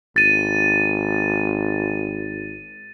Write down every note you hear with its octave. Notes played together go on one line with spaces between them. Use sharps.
G#1 A6 D#7